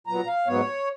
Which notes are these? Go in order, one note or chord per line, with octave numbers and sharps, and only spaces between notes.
A#2 F#3 B3 A#5
F5
G#2 F#3 B3 C#5